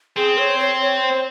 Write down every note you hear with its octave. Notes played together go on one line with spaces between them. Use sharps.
C4 G#4
C#5
C#5
C#5
C5